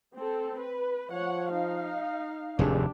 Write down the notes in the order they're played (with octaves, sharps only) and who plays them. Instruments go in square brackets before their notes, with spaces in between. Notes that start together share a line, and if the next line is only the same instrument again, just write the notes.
[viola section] C4 A4
B4
[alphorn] F3 [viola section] C#5 F#5
[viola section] D#4 F5
[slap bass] F1 D#2 A2 [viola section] D4 G4 [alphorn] G#4